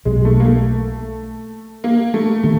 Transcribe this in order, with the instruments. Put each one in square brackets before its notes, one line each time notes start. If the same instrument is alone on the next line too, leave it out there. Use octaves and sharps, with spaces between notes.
[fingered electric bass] B1 B2 F#3 [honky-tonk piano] G#3
[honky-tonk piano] A3
A#3
A3
A#3
A3
[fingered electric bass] D#3 [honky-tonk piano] A3